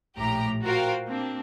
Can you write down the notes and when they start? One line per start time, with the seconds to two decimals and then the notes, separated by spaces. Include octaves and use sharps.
0.16 A#1 A2 G4 A#5
0.64 F4 F#4 A#4 C5 F5 G5
1.06 A#3 C4 D4